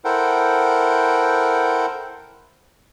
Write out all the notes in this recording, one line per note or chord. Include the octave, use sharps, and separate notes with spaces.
E4 A4 A#4 C5 F#5 G5